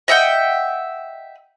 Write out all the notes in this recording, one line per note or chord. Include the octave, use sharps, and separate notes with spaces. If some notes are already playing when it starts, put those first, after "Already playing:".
D#5 E5 F#5 G5